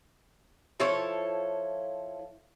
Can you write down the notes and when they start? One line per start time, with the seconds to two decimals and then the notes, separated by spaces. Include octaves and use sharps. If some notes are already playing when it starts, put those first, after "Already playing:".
0.80 F3 E4 A4 C#5